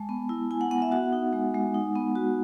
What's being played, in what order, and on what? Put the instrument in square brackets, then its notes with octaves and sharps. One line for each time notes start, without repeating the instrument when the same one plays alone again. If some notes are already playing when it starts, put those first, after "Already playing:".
Already playing: [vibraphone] G#3 A5
B3
E4
E4 G#5
F#5
B3 F#5
E5
F#4 F#5
D#4
G#3
G#3
D#4
B3
F#4